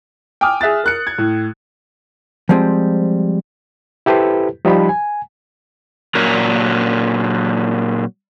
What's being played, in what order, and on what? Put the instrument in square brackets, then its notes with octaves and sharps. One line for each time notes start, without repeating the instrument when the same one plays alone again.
[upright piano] G5 G#5 D6 D#6 F6
G#4 E5 F#6 A6
A#4 F#6 C#7
G#6
A2
[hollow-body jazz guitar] F3 G3 G#3 C4
[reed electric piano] E4 G4 A4 B4 C5
F3 G3 D#4 G4 C5 B5
G#5
[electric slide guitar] A#2 F#3 A#4